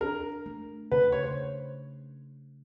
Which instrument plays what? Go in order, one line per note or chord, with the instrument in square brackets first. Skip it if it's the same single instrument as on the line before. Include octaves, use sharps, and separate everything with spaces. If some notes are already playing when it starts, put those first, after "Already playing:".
[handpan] D4 [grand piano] A#4
[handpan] A3
[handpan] C#3 [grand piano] B4
[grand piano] C#5
C5